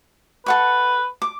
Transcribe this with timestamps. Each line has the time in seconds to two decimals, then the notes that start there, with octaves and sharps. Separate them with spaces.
0.46 A4 B4 F#5 C#6
1.22 D6